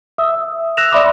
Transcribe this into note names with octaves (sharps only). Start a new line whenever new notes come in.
E5 D#6 E6
E6 F#6 A#6 E7 F7
D5 E5 B5 C6 D6 D#6